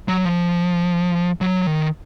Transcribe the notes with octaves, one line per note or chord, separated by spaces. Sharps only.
F#3
F3
F#3
D#3